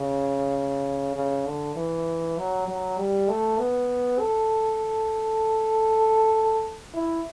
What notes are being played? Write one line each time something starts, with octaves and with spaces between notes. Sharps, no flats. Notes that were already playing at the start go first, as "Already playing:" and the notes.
Already playing: C#3
C#3
D3
E3
F#3
F#3
G3
A3
B3
A4
E4